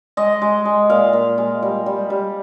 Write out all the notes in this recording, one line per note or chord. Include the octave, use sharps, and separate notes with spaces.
G#3 D#5
G#3
G#3
A#2 F5
A#2
G#3
G3
G3
G3